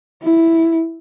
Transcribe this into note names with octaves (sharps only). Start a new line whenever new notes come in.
E4